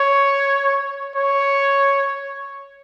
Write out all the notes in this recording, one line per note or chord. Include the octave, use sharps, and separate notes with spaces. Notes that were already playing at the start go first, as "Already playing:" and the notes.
Already playing: C#5
C#5